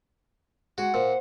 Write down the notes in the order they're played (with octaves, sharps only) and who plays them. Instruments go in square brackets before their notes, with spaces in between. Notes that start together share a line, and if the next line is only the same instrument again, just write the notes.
[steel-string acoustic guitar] G#3 [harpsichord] F#4 [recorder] F#5
[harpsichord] A#2 [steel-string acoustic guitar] C5